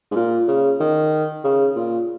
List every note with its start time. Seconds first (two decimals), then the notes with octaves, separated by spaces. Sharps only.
0.11 G#2
0.16 A#2
0.48 C#3
0.80 D#3
1.44 C#3
1.76 A#2